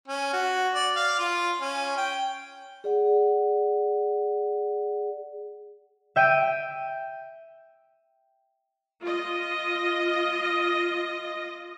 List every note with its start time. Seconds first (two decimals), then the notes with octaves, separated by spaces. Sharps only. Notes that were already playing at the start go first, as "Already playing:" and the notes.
0.08 C#4
0.33 F#4
0.75 D5
0.96 F5
1.19 F4
1.61 C#4
1.97 G5
2.84 G#4 D5 F#5
6.16 E5 G5 D7 D#7
9.01 F4 D#5